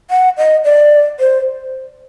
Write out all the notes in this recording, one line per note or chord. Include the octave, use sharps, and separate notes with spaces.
F#5
D#5
D5
C5